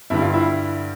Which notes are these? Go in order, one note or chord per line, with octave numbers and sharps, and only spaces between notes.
G2 D3 G3 E4
F4
E4